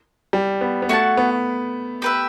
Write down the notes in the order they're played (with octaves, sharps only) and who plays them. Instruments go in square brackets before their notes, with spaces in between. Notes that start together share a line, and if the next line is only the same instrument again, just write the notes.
[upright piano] G3
B3
B3
[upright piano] A3 [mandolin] F#4 C#5 F#5 A5
[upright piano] B3
[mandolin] G4 B4 E5